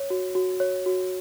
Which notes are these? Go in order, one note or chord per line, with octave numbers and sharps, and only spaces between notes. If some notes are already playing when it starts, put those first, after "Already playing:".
Already playing: C#5
F#4
F#4
C#5
F#4